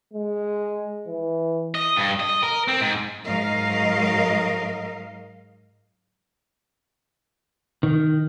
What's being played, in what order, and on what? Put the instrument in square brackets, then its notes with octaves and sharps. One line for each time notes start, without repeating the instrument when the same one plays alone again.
[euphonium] G#3
E3
[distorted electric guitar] D#5
G2
D#5
A#4
C4
G#2
[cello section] G#2 F#3 A#4 D#5 F5
[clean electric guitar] D#3